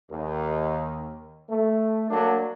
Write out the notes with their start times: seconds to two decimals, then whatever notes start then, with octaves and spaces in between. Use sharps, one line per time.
0.11 D#2
1.49 A3
2.10 F#3 A#3 D4